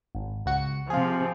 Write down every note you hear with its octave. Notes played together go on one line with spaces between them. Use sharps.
G#1
C#2 F#4 C#7
C3 F3 F4 G#4